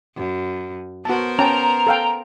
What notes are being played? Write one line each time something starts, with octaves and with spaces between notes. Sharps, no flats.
F#2
B3 F#4 A#4 C5 A5
C#4 G5 A5 A#5
A4 F5 G5